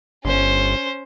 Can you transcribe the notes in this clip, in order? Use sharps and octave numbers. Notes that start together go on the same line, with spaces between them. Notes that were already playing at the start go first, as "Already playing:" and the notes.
G1 C#4 C5